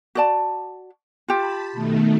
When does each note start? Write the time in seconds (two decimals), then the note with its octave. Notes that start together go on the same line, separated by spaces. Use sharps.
0.15 F#4 D5 A5
1.28 F4 G4 A5 B5
1.73 B2 D#3 A3